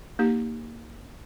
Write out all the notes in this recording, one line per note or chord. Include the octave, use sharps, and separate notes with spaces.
A#3 D#4 G4